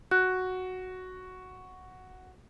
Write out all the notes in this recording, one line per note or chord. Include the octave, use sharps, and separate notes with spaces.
F#4 F#6